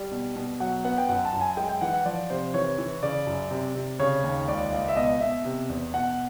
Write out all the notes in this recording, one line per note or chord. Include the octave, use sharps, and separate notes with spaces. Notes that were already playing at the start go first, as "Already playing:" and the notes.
Already playing: G3
B2
B2
F#3 F#5
B3 F#5
G5
F#2 F#5
A5
F#2
G#5
G#3 G5
G5
E3 F#5
F#5
F3 D5
C3 C5
E3 C#5
E3
C#3 D5
F#2
C3
C3
C#3 C#5
D#2
C#2 D5
C#2
E5
B2 D#5
B2 E5
C3
E2
B2 F#5